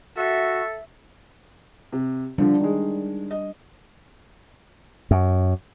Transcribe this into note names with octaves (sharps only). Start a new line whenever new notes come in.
F#4 A4 E5
C3
D3 F3 G3 D4
D#3 G#3
D#5
F#2